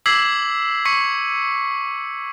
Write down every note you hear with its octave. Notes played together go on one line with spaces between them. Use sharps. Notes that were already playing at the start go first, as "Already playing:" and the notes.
D6 E6 G#6 B6 C7 F#7
C#6 B6 C#7